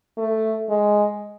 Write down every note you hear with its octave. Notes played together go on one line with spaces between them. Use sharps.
A3
G#3